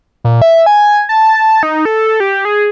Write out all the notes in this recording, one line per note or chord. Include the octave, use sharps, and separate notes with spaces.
A#2
E5
G#5
A5
D#4
A4
G4
G#4